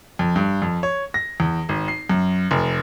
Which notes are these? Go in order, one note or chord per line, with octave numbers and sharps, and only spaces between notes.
F2
G2
F2
C#5
A#6
E2
G#1
C7
F#2
F1